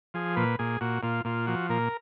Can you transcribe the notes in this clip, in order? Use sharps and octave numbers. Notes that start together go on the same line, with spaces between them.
F3 G#4
A#2 B4
A#2 G#4
A#2 F#4
A#2 F4
A#2 F4
F3 F#4
A#2 A#4